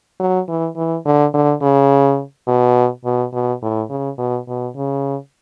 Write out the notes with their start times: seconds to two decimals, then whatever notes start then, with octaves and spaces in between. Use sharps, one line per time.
0.20 F#3
0.48 E3
0.76 E3
1.05 D3
1.34 D3
1.62 C#3
2.48 B2
3.05 B2
3.33 B2
3.62 A2
3.90 C#3
4.18 B2
4.48 B2
4.76 C#3